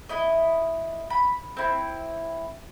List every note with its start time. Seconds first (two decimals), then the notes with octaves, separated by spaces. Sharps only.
0.09 E4 D#5
1.10 B5
1.57 C4 E4